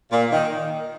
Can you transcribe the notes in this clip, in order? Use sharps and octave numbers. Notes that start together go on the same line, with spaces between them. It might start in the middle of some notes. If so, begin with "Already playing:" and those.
A#2
D#3